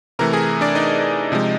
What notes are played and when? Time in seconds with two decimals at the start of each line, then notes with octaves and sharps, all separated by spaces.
0.19 C3 E3 A3 A#4 A#5
0.33 G#4 G#5
0.61 D4 D5
0.75 D#4 D#5
1.32 C3 F3 G#3